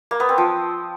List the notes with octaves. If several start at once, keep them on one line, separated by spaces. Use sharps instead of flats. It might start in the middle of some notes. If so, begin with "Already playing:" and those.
A#3
B3
C4
F3